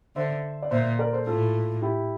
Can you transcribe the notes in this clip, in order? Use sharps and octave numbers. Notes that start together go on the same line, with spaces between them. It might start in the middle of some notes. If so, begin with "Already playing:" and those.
D3 C5 E5
D5
A#2 C5 E5
A#4 D5
A4 C5
A2 F4 A4
E4 G4